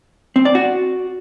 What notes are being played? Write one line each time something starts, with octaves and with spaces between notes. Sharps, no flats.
C4
D5
F#4